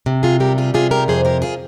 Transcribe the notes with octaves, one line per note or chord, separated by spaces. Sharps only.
C3
F4 G#4
G3 G4 A#4
F4 G#4
C3 F4 G#4
G4 A#4
F2 G#4 C5
G4 A#4
F4 G#4